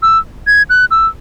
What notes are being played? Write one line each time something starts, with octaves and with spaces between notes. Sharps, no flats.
E6
G#6
F#6
E6